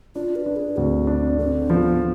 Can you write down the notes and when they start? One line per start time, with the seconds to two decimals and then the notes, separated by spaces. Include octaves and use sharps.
0.15 D4 F4
0.36 B4
0.46 D4
0.56 G#4
0.76 D2 C4
1.07 D4
1.39 D3 C4
1.69 F3 B3